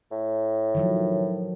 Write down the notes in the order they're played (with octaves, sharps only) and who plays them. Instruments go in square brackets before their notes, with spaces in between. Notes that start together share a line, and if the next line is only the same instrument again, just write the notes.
[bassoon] A2
[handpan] D#3 F3 F#3